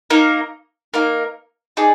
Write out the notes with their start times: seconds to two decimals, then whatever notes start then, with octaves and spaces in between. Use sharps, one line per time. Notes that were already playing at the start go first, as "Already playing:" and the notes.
0.10 A#3 D#4 A#4
0.94 A#3 D#4 A#4
1.77 D#4 G#4 D5